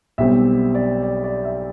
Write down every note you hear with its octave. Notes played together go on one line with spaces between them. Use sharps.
B1 B2 G3 C4 E5
D5
D5
D5
E5